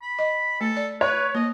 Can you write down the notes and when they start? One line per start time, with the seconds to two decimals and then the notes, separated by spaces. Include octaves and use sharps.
0.02 B5
0.19 D#5
0.61 A3 A4
0.77 D5
1.01 B4 C#5
1.35 A#3 D#5